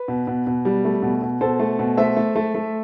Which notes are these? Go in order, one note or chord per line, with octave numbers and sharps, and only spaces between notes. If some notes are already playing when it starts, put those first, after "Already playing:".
Already playing: B4
B2
B2
B2
G3
A3
B2
B2
B2 A4 C5
A3
B2
A3 C5 E5
A3
A3
A3